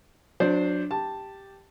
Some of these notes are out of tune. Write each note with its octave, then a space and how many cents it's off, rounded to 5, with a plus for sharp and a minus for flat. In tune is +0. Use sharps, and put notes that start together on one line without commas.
F#3 -30 D4 +0 C5 +0
G4 +0 A5 +5